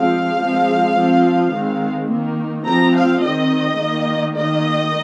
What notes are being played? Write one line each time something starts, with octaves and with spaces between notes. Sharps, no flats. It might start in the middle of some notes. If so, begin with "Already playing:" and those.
Already playing: F3 G#3 C4 F5
F3 G#3 C4
F3 C4
D#3 G#3 C4
D#3 A#3
F3 C4 A#5
F5
D#3 C4 D#5
D#3 A#3
D#3 A#3 D#5